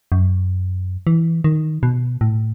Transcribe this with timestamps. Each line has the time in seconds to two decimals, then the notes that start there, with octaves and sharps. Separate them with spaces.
0.12 F#2
1.07 E3
1.44 D#3
1.83 B2
2.21 A2